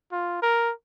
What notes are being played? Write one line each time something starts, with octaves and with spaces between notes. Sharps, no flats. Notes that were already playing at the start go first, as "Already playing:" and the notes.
F4
A#4